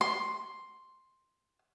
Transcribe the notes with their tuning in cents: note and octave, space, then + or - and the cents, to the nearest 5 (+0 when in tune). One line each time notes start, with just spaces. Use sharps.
C6 +5